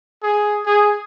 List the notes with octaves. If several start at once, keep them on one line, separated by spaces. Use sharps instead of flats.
G#4
G#4